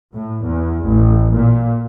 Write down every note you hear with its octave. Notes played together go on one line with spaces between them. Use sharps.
A2
E2
A1
A#2